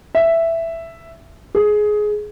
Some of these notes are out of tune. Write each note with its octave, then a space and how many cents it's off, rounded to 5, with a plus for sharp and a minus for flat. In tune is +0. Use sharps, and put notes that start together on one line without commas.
E5 +5
G#4 +15